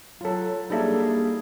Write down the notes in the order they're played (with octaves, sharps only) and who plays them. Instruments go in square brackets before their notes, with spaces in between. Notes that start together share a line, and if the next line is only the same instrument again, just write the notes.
[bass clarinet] F#3 [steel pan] F4 A4
[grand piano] G3 D4 [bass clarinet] A#3 [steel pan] D#4 A4 E5 [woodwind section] G#4